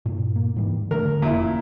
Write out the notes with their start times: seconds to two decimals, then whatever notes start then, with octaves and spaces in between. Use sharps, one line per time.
0.06 G2 A#2
0.36 A#3
0.56 G#2 E3 G3
0.91 D3 G3 A3 A#4
1.22 F1 A#2 E4